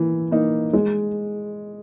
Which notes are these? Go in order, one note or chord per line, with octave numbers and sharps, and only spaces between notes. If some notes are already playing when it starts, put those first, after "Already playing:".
Already playing: E3 A#3
A#3 D#4
G#3